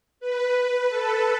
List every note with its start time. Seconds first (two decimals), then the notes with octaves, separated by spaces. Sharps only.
0.20 B4
0.89 A4